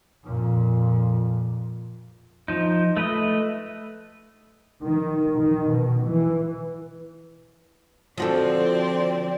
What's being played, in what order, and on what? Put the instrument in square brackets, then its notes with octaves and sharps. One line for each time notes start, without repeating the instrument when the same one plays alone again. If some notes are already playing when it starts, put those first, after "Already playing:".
[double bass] F2 A#2
[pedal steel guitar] F3 D#4
A3 B4 D#5
[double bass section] D#3
D#3
B2
E3
[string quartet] D3 C4 D5 [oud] F3 F#4 A4